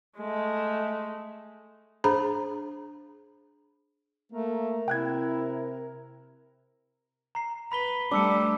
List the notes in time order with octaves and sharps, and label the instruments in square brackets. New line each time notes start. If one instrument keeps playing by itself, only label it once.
[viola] G#3 A3
[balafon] D4 G#4 C5 A#5 B5
[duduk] A3 [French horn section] A#3 [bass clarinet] A#4
[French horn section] C3 [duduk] E4 [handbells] G5 F#6 G#6
[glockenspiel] A#5 C7
[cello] B4 [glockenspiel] B5 B6 G7
[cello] G3 A3 [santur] D4 [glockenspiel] D6 E6 C#7